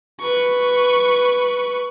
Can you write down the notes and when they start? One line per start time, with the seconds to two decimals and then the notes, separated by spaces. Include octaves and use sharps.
0.21 B4 C#6